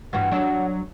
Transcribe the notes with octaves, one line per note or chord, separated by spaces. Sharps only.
G2 E3 F#4 F#5
F#3 D4